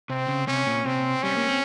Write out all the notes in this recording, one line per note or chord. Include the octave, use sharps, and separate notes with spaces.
C3 C4
C#3
C3 C#4
A#2
C3 C4
G3 C#4
A#3
C4